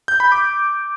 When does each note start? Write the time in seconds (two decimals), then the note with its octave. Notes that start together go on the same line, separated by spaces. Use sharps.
0.08 G6
0.20 B5
0.32 D6